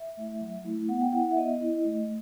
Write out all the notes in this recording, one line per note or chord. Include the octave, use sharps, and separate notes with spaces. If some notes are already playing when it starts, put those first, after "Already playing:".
Already playing: E5
A3 E4
F#3
A3 E4
B3 F#5
G5
E4 F#5
F#5
E5
B3 D#5
E4
A3